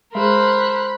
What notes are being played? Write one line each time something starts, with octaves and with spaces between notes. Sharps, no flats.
G#3 G#4 A#4 C5 B5 F#6